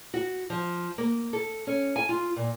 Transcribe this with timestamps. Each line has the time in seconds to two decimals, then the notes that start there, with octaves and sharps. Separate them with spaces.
0.14 F#4
0.50 F3
0.98 A#3
1.33 A4
1.67 C#4
1.96 G#5
2.09 F4
2.36 A#2